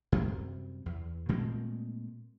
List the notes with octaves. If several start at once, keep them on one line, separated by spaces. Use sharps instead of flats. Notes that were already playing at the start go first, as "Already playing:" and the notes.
F#2 C3 G3
E2
A#2 G#3 A3 C4